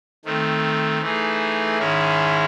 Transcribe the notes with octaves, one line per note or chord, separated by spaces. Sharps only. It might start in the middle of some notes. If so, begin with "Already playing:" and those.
D#3 A3 C4
E3 A3 D#4 G#4
G#2 D#3 G#3 C#4 E4